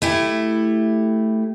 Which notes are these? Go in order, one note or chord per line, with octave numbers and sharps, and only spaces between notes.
A3 E4 G4